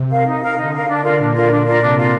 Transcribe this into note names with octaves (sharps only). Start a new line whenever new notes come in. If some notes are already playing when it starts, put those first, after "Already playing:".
Already playing: C3
A#4 F5
D#4
A#4 F5
D3 D#4
A#4 F5
D4
F4 A#4 D5
A#2 D4
F4 A#4 D5
D4
F4 A#4 D5
C3 D4
F4 A#4 D5